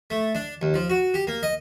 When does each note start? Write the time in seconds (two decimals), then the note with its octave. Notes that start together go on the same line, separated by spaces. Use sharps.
0.10 A3
0.35 D4
0.62 D#2
0.74 F3
0.90 F#4
1.14 G4
1.27 A#3
1.43 D#5